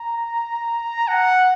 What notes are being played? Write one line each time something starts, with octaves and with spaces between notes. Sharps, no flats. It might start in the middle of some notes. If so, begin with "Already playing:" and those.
Already playing: A#5
F#5